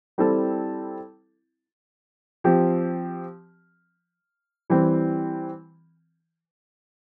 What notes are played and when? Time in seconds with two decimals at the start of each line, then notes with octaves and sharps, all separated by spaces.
0.18 G3 C4 E4 A4
2.44 F3 C4 G4
4.70 E3 G3 C4